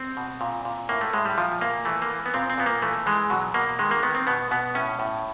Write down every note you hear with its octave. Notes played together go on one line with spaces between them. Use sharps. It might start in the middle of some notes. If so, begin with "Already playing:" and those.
Already playing: C4
B2
A#2
A#2
A2 A#3
A3
A2 G#3
G3
A#2 F3
A#2 A#3
E3 A3
A#3
E3
B3
A#2 C4
C4
A#2 B3
A#3
E3 A3
E3 G#3
B2 F#3
B2 A#3
D#3 G#3
A#3
D#3 B3
C4
B2 B3
B2 B3
A2 C#4
A2